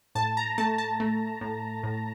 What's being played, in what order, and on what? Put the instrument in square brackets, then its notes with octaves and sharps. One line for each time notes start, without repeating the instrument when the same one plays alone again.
[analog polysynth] A2 A5
A#5
A3 A5
A5
A3
A2
A2